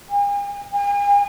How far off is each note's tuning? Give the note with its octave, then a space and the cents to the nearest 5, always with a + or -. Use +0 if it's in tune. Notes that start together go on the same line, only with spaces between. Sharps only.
G#5 -45
G#5 -45